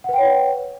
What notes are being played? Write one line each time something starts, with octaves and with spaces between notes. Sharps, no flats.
B4 C#5 F#5 G5